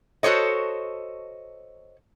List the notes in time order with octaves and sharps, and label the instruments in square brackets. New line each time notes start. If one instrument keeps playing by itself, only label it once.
[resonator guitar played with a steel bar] F#4 A4 C5 C#5 D#5